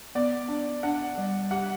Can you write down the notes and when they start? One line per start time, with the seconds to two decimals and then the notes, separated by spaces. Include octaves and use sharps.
0.15 B3 D5
0.49 D4
0.83 D4 F#5
1.18 G3
1.51 G4 F#5